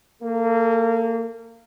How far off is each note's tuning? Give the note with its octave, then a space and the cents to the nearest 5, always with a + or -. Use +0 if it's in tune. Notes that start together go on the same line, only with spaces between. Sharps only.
A#3 -25 A4 +0